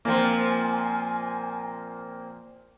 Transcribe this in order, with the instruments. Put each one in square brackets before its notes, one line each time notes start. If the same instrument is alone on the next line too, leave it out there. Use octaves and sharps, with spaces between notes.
[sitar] A#2 F3 [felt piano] A#3 C4 [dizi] G#5